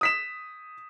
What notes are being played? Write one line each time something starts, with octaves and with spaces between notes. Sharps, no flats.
D#6 B6 E7